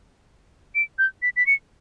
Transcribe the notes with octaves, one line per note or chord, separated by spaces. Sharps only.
D7
G6
B6
B6
C#7